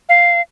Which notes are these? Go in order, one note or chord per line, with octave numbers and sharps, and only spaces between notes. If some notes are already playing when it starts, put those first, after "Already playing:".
F5